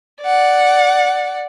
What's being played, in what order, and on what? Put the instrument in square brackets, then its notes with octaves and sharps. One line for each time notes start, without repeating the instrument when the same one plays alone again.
[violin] D5 F#5